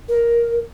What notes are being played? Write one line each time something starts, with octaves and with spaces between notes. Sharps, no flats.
A#4